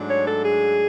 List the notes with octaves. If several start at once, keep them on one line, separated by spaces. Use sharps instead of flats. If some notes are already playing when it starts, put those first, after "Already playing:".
Already playing: G#2 F#3 A3 D4
C#5
A4
G#4